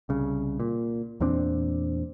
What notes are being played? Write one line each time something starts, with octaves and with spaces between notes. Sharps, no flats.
C2 C#3
A#2
E2 A#2 C4 D4